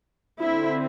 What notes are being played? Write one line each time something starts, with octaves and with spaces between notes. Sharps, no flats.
D3 C4 E4